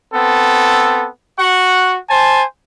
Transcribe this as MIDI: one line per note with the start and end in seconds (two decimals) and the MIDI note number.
0.12 1.07 59
0.12 1.07 60
0.12 1.07 69
1.38 1.97 66
1.38 1.97 78
1.38 1.97 85
2.09 2.43 72
2.09 2.43 80
2.09 2.43 81